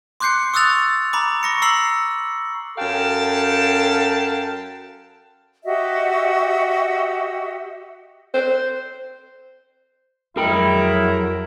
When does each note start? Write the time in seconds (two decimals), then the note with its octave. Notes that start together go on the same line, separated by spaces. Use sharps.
0.20 C6 D6 F#6 G6 C7 C#7
0.54 C#6 D#6 E6 F#6 A6 F7
1.13 A#5 B5 D6
1.43 C#6 A#6 C#7
1.62 A#5 E6 C7 F#7
2.78 F#2 A4 F5 G5 A5
5.65 F#4 G4 D#5 E5
8.34 C5
10.37 F2 F#3 E4 G#4 A#4 G5 B5